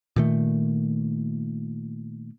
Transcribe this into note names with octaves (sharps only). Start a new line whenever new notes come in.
A#2 D#3 A3